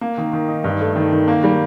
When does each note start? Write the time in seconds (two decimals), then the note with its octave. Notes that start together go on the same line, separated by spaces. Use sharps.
0.01 A#3
0.18 D#3
0.33 D#3
0.49 D#4
0.64 G2
0.81 A3
0.96 D#3
1.12 D#3
1.28 A#3
1.44 G3